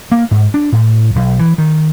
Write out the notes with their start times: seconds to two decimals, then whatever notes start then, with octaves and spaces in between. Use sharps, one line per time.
0.12 A#3
0.31 G#2
0.54 D4
0.72 A2
1.16 B1
1.39 E3
1.58 D#3